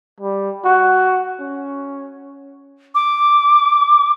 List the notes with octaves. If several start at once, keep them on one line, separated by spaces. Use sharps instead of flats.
G3
F#4
C#4
D6